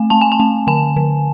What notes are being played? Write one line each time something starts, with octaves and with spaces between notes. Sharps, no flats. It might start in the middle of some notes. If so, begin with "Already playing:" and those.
Already playing: A3 G#5
A3 A5
G#5
A5
A3
D3 G#5
D3